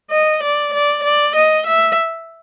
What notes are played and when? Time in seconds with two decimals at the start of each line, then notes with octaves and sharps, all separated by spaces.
0.11 D#5
0.43 D5
0.73 D5
1.03 D5
1.35 D#5
1.66 E5